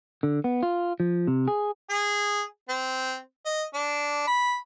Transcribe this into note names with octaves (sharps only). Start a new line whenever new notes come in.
D3
B3
F4
F3
C3
G#4
G#4
C4
D#5
D4
B5